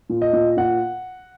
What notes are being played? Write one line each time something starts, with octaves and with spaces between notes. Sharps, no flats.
A#2
D#5
A#2
A#2 F#5